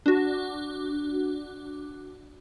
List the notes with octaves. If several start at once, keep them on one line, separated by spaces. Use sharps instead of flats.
D4 F#4